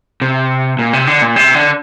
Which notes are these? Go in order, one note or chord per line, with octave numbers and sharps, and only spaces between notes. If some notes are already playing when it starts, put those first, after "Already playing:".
C3
A#2
C3
D3
A#2
C3
D3